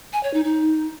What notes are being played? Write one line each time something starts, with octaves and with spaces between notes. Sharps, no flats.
G#5
C#5
D#4
D#4